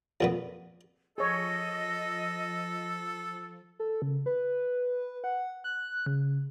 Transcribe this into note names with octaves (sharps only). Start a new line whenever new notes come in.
F2 A#2 B3
F3 G#4 A4 C#5 D#5
A4
C#3
B4
F#5
F#6
C#3